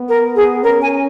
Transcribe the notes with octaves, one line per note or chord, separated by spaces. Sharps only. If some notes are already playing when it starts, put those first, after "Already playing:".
Already playing: B3
A#4
G#4
C#4 A#4
G#5